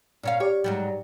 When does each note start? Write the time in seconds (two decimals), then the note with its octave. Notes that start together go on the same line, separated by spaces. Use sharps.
0.23 A#2 C#4 F5
0.40 G4 C#5 D5
0.64 G#2 F#3 G3